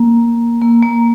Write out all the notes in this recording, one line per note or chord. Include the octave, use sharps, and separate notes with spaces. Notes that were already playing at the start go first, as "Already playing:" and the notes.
Already playing: A#3
A#3
A#3